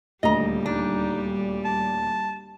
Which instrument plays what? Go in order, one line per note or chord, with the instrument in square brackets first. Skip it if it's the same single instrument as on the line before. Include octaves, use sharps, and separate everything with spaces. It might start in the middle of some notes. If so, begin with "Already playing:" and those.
[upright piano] D#1 D2 [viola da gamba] G3 [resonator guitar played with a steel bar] D#5 A#5
[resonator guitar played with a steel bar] D4 [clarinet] D#4
[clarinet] A5